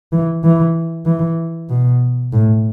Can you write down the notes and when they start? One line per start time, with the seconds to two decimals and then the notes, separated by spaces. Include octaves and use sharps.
0.13 E3
0.44 E3
1.06 E3
1.70 B2
2.32 A2